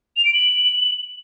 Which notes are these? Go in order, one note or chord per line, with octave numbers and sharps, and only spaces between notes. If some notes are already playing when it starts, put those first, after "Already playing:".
F7
D7
F#7